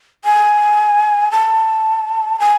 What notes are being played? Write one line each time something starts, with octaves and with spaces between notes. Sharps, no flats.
G#5
A5
G#5